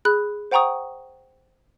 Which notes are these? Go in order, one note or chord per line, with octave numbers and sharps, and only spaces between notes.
G#4 B5 F#6
C5 F#5 G5 A#5 C#6 D#6